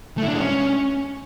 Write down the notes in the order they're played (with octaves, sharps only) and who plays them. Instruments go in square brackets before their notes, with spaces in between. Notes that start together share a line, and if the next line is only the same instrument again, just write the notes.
[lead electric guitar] A3
E4
D4
G#3
C#4